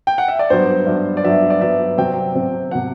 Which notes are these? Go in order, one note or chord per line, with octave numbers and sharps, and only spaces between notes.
G5
F#5
E5
D5
G2 F#3 B3 C5
G2 F#3 B3
D5
G2 F#3 B3 E5
D5
G2 F#3 B3 E5
C3 F#3 C4 G5
C3 F#3 C4
C3 F#3 C4 F#5